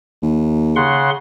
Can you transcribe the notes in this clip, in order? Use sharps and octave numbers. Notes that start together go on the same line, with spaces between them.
D#2
C#3 F#5 C6